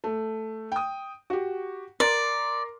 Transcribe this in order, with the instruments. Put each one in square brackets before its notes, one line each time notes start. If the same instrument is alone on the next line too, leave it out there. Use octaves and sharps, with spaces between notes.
[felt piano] A3
G5 D#6
F#4 G4
[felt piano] A#4 C6 [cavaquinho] D5